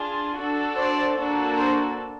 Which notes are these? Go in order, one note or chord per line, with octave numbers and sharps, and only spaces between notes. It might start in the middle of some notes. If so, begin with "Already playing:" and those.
Already playing: D4 F4 G#4
D4 F#4 A4
C5 D5
A#3 D4 F#4 A4
A#4 C5